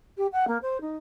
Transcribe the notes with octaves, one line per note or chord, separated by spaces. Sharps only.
G4
F#5
A#3
C5
D#4